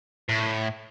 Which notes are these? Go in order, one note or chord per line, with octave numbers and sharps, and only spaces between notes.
A2